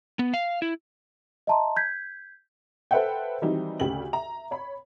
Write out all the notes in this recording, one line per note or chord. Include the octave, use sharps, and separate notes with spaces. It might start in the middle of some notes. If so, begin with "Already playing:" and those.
B3
F5
E4
D#5 E5 A5 A#5 C6
G6 G#6 B6
A4 B4 C5 E5 F#5 G5
D#3 E3 F#3 G3 C4 D#4
D2 C#3 G4 F#7
E5 A#5
C#5 B5